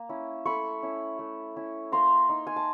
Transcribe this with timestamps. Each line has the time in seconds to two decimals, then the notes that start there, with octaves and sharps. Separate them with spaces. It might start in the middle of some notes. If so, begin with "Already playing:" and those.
Already playing: A#3
0.09 C#4 E4
0.46 A3 B5 C#6
0.83 C#4 E4
1.19 A3
1.56 C#4 E4
1.92 A#3 A#5 C6
2.29 D#4
2.47 G#5
2.56 A5